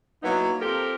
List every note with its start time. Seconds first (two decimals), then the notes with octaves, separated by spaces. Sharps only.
0.23 F#3 A#3 B3 D#4 E4
0.61 C4 F4 G4 A4 A#4